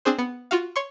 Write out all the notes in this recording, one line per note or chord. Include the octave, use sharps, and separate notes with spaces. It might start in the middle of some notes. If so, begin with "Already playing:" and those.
C4 D4 G#4 C5
B3
F4 F#4 F5
C#5 C6 C#6